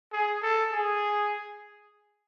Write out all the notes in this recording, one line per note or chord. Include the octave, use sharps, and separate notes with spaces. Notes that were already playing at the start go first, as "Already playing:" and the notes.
G#4
A4
G#4